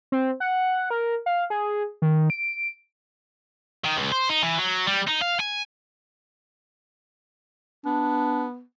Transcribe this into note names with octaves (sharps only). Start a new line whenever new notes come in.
C4
F#5
A#4
F5
G#4
D#3
D7
D#3
C#2
C5
D#4
E3
F#3
G3
D#4
F5
G#5
B3 D4